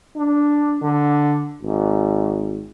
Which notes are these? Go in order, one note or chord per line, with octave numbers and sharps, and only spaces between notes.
D4
D3
G#1